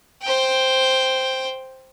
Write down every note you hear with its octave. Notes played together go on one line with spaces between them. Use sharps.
C5 G5